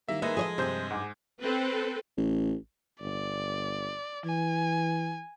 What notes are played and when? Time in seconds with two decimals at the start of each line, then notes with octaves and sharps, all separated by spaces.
0.08 D#3 G3 A#3 E4 E5
0.22 G#3 A#3 D#4 B4 E5
0.37 F3 G#4 A4 C#5 D#5 D#6
0.58 G2 C3 G#4 C5 G6
0.91 G#2 F#5 G#5 D6
1.42 C4 A4 B4
2.17 A1
3.01 G1 D5
4.25 E3 G#5